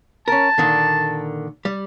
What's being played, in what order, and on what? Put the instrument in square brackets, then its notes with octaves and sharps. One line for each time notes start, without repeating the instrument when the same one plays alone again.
[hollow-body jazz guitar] C#4 A#4 [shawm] A5
[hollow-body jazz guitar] A#2 D3 D#3
G3